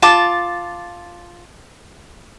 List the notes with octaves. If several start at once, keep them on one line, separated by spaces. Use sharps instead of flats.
F4 A5 D6